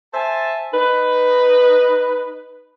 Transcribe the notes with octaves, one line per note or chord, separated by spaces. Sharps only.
C5 E5 G#5 A5
D#4 B4